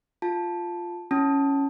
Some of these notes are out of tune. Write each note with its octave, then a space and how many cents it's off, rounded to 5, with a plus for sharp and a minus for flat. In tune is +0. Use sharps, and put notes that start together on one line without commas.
F4 +0 A5 -5
C#4 +0 E4 +10 A5 +0